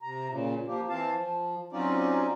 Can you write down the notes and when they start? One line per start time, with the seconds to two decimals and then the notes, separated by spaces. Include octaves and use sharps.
0.02 C3 A#5
0.30 A#2 C#3
0.67 F3 A#3 G4
0.89 E3 C4 F5 A5
1.14 F3
1.72 F#3 C4 C#4 D#4 F4 D5